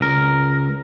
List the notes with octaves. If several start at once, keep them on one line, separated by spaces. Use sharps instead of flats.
C#2 A#4